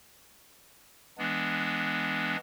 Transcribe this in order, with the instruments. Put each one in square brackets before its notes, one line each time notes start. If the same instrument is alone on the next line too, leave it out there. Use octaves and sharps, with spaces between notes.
[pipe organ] E3 G#3 B3 D4